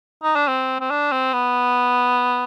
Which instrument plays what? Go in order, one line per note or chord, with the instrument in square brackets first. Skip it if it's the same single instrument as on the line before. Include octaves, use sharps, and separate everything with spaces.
[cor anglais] D#4
D4
C4
C4
D4
C4
B3